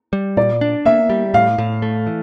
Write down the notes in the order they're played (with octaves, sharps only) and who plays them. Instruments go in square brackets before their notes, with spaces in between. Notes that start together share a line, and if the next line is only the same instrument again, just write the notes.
[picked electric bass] G3
[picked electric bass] A#2 [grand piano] D5
[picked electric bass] D4
[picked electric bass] A#3 [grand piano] E5
[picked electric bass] G3
[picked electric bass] A2 [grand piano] F5
[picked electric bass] A2
A3
E3